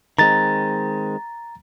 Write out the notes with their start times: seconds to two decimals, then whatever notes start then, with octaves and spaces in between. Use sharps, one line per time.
0.19 D#3 G#3 C4 A#5 A6